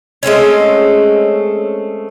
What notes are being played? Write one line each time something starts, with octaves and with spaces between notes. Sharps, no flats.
G#3 A3 C4 C#4